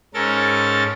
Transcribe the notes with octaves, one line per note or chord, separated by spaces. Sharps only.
G#2 C#4 A4 A#4 A6